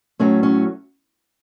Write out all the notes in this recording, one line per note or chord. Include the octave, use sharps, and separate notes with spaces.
A2 F#3 A3 C#4
C#4